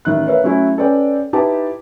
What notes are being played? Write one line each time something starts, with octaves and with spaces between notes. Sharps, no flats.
A1 D#3 E5 F#6
A#4 B4 C#5 E5 F5
F#3 A3 C#4 E4
C#4 A4 B4 C#5 D5 G5
D#4 E4 G4 B4 A5